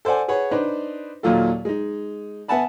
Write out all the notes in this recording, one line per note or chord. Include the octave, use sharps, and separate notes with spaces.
A4 C5 D5 F#5 G#5
G#4 B4 C#5 F#5
D4 D#4 B4 C5
D#2 A#2 F#3 F4 A4
G#3 D#4
B3 E5 F#5 G#5 A5 B5